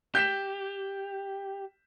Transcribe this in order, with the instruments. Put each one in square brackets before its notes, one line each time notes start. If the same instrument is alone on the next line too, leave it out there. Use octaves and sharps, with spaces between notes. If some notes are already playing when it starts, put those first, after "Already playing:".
[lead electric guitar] G4 [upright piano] G6 B6 E7